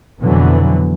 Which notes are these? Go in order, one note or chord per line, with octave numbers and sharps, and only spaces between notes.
F2 B2 D3 E3 F#3 B3